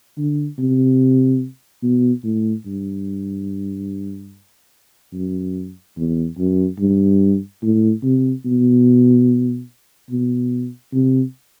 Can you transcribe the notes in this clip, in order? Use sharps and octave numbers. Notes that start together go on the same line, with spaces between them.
D3
C3
B2
A2
G2
F#2
E2
F#2
G2
A2
C3
B2
B2
C3